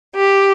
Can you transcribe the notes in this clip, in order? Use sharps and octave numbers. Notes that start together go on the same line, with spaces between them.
G4